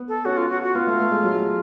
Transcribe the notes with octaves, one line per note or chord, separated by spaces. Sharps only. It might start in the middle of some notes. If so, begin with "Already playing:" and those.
Already playing: B3
A4
C#4 F#4
F4
F#4
F#4
B3 F4
A3
A3
G#3
F#3